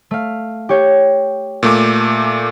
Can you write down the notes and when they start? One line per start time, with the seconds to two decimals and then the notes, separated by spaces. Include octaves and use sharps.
0.11 A3 F5
0.69 G4 C#5 G5
1.63 A#2 A3 D6